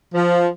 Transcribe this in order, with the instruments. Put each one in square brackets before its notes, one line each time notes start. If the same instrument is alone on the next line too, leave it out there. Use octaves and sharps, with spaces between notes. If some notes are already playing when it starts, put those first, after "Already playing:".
[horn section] F3